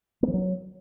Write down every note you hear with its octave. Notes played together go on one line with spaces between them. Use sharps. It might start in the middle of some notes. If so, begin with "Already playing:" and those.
A#3
F3
F#3